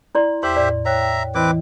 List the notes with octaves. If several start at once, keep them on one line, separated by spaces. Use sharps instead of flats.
E4 D5 C6
E2 G4 C5 E5 C6
A2 D5
C#5 E5 G5 A#5 F#6
G5
E3 C4 E4 B4 D#5 D6